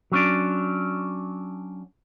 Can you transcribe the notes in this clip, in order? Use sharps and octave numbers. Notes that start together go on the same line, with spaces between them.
F#3 C#4 D4